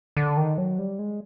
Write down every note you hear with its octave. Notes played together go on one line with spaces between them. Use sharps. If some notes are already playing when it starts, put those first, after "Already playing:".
D3
D#3
F#3
G3
G#3